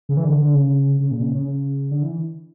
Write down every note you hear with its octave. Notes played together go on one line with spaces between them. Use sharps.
C#3
E3
D3
D3
C#3
C#3
A#2
C#3
C#3
C#3
D3
E3